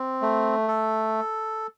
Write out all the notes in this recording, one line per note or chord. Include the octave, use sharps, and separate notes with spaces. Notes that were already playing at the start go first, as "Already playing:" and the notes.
Already playing: C4
A3
A4